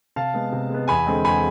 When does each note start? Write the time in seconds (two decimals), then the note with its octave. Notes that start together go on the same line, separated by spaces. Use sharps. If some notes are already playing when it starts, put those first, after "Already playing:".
0.16 C3 F5 A5
0.34 G#3 B3
0.52 C3
0.70 G#3 B3
0.88 E2 G#5 B5
1.06 D3 G#3 C4
1.24 E2 G#5 B5